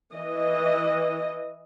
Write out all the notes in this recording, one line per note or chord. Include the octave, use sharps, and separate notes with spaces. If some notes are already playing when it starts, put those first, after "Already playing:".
E3 D#5